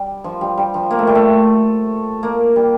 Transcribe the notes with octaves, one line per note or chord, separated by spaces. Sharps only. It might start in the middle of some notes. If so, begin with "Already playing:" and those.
Already playing: G3
F3
G3
G3
F3
A#3
A3
G3
A3
A#3
G3